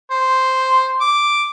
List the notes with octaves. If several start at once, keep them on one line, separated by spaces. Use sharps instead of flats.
C5
D6